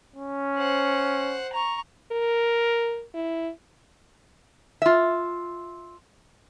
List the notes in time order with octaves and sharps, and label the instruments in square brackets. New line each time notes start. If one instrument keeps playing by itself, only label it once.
[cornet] C#4
[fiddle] C5 F#5
A#5 C#6
[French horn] A#4
E4
[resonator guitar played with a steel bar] F4 E5